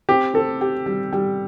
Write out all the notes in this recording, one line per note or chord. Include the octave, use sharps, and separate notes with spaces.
C4 G4
C4 A4
G4
G3
G3